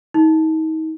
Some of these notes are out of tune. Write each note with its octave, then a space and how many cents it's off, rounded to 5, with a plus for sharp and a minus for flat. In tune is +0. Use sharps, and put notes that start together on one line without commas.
D#4 +35